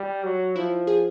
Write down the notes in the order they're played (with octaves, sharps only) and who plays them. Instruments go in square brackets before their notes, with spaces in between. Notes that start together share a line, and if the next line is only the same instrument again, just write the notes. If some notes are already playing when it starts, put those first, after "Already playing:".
Already playing: [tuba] G3
F#3
[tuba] F3 [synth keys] E4
[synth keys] G#4